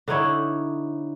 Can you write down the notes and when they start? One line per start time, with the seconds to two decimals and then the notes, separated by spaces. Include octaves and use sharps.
0.08 D3 D#4 E4 C#5